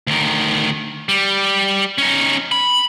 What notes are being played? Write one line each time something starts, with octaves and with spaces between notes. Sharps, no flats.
D2 D#3
G3
C#4 D#4
B5